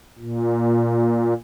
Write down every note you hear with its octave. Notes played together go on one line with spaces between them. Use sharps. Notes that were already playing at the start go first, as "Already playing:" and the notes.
A#2